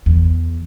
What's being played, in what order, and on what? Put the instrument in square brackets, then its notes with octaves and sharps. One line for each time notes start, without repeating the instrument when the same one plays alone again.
[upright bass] E2